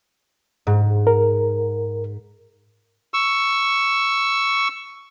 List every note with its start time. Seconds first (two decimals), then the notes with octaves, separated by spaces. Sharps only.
0.67 G#2
1.07 A#4
3.14 C#6 E6